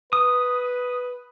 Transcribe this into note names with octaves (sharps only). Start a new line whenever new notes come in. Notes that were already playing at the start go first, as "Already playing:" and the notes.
B4 D#6